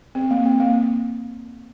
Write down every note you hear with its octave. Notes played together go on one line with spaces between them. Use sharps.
C4
A#3
C4
A#3